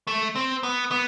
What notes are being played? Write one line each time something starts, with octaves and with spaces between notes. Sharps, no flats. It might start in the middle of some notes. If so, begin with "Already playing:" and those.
A3
C4
B3
B3